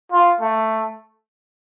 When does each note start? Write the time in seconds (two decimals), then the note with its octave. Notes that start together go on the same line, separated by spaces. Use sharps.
0.12 F4
0.41 A3